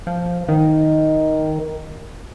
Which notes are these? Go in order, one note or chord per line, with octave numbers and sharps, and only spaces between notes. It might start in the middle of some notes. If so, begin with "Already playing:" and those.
F3
D#3